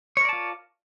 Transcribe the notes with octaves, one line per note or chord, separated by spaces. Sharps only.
F4 A#4 C#5 D5 A5